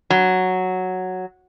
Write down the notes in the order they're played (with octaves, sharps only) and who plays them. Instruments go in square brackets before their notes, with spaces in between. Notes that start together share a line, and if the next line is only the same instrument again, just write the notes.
[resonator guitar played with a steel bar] F#3